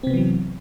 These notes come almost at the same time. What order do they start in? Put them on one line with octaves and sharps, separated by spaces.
C4 C3 B3 E3 F#3